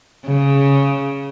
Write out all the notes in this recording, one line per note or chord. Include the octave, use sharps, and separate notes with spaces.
C#3